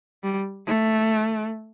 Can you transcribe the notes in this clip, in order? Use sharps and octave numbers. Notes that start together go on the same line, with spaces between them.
G3
A3